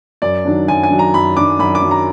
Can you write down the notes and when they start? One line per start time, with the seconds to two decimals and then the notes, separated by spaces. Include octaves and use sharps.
0.22 F#2 D5
0.45 D#3 F#3 D4
0.68 F#2 G#5
0.83 G#5
0.91 D#3 F#3 D4
0.99 A#5
1.14 F#2 B5
1.37 D#3 F#3 D4 D6
1.59 F#2 B5
1.75 D6
1.83 D#3 F#3 D4
1.91 A#5